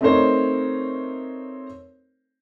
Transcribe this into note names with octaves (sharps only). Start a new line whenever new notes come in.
A3 C4 D#4 A#4 C5 C#5